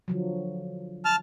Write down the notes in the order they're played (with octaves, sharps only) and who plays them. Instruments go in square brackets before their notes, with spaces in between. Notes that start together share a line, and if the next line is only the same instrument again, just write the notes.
[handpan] D3 F3 F#3
[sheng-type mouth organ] A5 F6